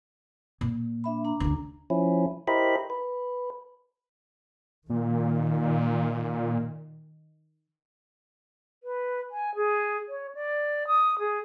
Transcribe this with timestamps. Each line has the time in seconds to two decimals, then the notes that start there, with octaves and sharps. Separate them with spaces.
0.61 A#2
1.04 D4 E5 B5
1.25 D4 A#5
1.40 D2 C#3
1.90 F3 C#4 E4
2.48 E4 G4 A#4 C5 D#5 B5
2.90 B4
4.90 A#2 D#3
8.83 B4
9.31 G#5
9.55 G#4
10.09 C#5
10.35 D5
10.87 D#6
11.19 G#4